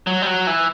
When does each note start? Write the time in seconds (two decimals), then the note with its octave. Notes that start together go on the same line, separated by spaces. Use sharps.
0.07 F#3
0.22 G3
0.27 F#3
0.47 E3